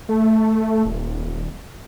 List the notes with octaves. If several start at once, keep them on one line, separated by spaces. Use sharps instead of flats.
A3
D#1